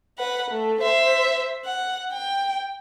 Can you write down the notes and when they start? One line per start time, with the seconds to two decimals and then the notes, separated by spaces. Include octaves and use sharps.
0.18 B4 F#5
0.51 A3
0.81 C5 E5
1.65 F#5
2.12 G5